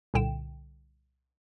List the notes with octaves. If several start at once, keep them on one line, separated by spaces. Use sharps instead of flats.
C2 A#2 D3 G5 E7